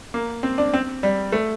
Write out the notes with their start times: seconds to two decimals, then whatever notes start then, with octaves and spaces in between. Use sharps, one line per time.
0.14 A#3
0.43 C4
0.58 D4
0.74 C4
1.03 G3
1.32 A3